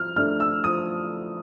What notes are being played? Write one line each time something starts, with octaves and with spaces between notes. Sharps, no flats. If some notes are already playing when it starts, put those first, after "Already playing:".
Already playing: F3 F6
A3 D4 F6
E6
F3 D#6